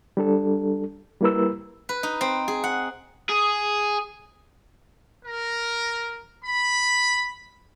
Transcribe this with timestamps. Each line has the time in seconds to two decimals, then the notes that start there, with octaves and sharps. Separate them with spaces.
0.17 G3 D4 A4
1.21 G3 A#3 E4 A#4 B4 E6
1.89 B4
2.03 D#4
2.21 C4
2.48 G#4
2.64 F#5
3.30 G#4
5.25 A#4
6.44 B5